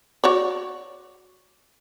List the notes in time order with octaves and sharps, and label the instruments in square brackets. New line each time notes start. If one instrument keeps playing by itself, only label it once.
[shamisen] F#4 C#5 D5